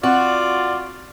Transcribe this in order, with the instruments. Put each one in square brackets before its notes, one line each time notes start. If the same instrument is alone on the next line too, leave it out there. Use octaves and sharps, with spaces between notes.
[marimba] C4 [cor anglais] F4 [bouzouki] F#4 [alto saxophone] D5